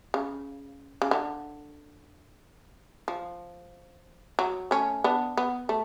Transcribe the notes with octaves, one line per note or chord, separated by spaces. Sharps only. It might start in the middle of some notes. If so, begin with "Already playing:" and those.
C#3
C#3
D3
F3
F#3
A3 C#4
B3 D4
B3
A3